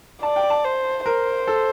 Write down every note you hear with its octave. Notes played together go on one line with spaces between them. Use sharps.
D5 A5
G5
A5
C5
A#4 C5
A4